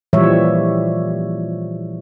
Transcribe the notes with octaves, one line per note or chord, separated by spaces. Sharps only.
A#2 E3 F3 G3 C#5 E5